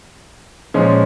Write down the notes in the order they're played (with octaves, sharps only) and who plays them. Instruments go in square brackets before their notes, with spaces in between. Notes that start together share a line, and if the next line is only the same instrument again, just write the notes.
[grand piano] A#2 F3 G#3 C#4